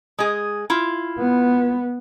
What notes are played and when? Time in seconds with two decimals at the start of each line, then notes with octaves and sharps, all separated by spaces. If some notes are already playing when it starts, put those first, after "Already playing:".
0.19 G#3 G#4
0.70 E4 F4
1.19 B3